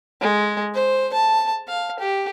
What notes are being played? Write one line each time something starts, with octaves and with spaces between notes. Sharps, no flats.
G#3
C5
A5
F5
G4